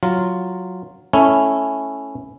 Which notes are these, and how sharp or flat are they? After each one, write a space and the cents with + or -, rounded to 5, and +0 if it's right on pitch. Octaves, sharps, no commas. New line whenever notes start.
F#3 +0 F4 +0
A3 +0 C#4 +0 E4 +0